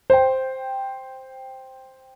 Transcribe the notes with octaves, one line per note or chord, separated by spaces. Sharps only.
C5 G5